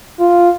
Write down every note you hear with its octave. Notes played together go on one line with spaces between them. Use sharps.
F4